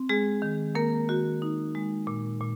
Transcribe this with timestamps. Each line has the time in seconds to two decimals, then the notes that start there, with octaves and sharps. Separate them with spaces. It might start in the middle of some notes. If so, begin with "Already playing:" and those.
Already playing: C4
0.09 G#3 G#4
0.42 D#3
0.75 D#3 A#3 A#4
1.09 D#3 F#4
1.42 D#4
1.75 G#3
2.07 A#2
2.41 A#2